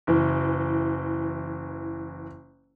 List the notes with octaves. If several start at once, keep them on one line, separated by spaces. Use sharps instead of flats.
F#1 E3